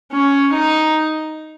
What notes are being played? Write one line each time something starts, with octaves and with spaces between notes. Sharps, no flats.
C#4
D#4